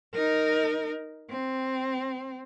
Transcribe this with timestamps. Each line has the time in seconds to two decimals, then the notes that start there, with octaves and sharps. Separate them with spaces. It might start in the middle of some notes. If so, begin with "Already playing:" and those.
0.14 D#4 A#4
1.30 C4